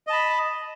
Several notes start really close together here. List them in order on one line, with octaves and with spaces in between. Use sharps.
D#5 A5 B5